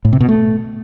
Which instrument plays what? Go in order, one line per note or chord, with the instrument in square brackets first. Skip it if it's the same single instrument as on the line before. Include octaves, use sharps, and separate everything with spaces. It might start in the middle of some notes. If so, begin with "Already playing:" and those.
[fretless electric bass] A2
C3
B2
A3